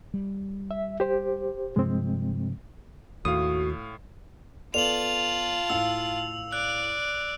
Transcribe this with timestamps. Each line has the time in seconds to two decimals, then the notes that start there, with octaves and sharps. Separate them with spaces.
0.14 G3
0.71 E5
1.00 G4 C5
1.76 G2 C3 F3 G#3 C4
3.25 D#2 A2 F#4 F5 D#6
4.74 B3 F4 A4 D5 A5 F7 F#7
5.70 A2 F5 E6
6.52 D5 F#6